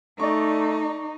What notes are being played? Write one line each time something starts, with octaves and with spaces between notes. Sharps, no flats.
A3 D#4 D5 C#6